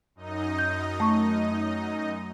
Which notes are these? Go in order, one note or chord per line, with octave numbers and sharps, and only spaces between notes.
F#2 D#4 D#5
G6
A3 C#6